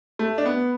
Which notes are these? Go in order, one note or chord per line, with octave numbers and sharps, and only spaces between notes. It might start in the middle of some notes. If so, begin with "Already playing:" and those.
A3
D4
B3